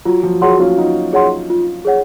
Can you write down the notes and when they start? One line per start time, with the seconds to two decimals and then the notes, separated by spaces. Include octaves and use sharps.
0.05 F#3 F4
0.23 F3
0.41 F#3 G#4 C#5 F#5 C6
0.60 C#4 F4
0.77 D#4 F4 F#4
1.13 G#4 C#5 F#5 C6
1.50 F4
1.85 G#4 C#5 F#5